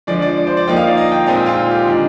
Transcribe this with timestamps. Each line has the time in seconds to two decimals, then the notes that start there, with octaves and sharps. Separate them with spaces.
0.07 F3 G#3 D4 D5
0.22 D5
0.37 D5
0.47 C5
0.57 D5
0.68 F3 A#3 D#4 G5
0.77 F5
0.87 D5
0.97 D#5
1.12 G5
1.27 A#2 G#3 C4 D#4 D#5
1.46 F4
1.56 F4
1.71 G4
1.86 D#3 G#3 D4